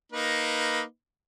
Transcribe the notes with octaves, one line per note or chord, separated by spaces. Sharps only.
A#3 D#4 B4